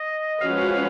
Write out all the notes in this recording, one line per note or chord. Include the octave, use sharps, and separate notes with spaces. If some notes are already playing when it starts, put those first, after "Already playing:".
Already playing: D#5
F3 G#3 C#4 F#4 B4 F5